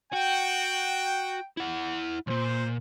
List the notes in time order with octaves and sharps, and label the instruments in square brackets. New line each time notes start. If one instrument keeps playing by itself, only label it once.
[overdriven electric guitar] F#4 [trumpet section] G5
[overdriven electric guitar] E4 F#5
[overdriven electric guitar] C#2 A#2 [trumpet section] C5